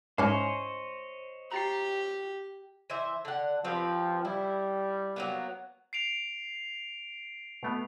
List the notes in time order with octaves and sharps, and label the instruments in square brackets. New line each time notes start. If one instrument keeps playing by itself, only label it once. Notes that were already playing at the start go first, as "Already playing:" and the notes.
[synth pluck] C2 G#2 G#3 [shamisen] C#4 E4 [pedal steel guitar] C5 C#5 D#5
[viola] G4 [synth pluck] A#5 A6 C7
[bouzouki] E3 C5 E5
D3 F#5
[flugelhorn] F3 [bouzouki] C4 G4 B4
[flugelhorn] G3 [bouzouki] E4
[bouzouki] F#3 A#3 B3
[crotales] C7 D7 F7
[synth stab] B2 A3 B3